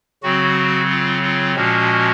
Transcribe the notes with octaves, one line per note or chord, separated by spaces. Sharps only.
C#3 F#3 C4 F#4
F4
F4
A#2 F3 G#3 C#4 F#4